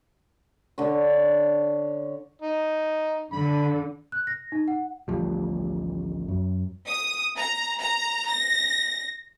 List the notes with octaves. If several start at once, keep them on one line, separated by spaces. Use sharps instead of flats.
D3 C#5
D#4
D3 B5
F#6
A#6
D#4
F#5
A1 D2 F3 G3
F#2
D#6
A#5
A#5
A#6